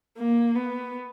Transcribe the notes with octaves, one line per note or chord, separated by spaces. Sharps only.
A#3
B3